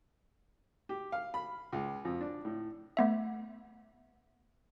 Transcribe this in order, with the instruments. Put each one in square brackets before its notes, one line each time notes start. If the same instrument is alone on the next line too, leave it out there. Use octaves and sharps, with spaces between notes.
[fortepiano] G4
F5
B5
C#2
F2
D4
A2
[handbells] A3 B3 E5